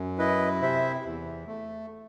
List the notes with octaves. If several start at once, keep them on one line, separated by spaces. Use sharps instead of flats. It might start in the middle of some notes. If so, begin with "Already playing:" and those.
Already playing: F#2
E4 B4 D#5
C3 C5 E5
E2
A3